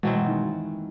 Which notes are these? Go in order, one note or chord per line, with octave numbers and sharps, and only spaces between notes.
B2 E3 F#3 C4
E3
D#3